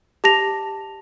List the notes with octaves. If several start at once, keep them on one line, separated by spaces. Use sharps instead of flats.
G4 A5 A#6 F7